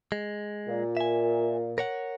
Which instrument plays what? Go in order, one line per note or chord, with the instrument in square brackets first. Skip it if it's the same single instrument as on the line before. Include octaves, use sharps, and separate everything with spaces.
[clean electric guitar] G#3
[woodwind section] A#2
[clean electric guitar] E5 G#5
A#4 C#5 F#5